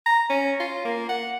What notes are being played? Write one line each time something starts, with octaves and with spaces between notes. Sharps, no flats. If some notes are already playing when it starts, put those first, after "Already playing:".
A#5
C#4
F4
A#3
F#5